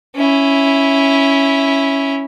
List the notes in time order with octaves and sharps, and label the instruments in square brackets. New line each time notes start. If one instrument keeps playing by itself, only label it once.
[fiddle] C#4 E4